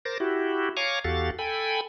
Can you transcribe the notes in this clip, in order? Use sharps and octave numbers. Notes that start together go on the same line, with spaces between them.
A#4 C5 D6 A6 A#6
E4 F#4 G4
C#5 F5 G#5 A#5 C#6 D6
E2 F#4 G4 A4 F5 A6
A4 G5 G#5 B5